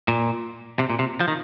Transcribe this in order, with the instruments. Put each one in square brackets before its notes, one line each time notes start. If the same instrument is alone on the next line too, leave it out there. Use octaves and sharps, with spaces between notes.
[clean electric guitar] A#2
C3
A#2
C3
F3
D#3